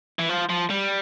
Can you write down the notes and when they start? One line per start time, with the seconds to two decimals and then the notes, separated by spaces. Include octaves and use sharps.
0.19 E3
0.29 F3
0.49 F3
0.70 G3